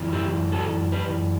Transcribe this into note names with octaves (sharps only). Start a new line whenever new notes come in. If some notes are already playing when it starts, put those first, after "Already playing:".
Already playing: F#2 E3
E4 G4
F#4 A4
G4 B4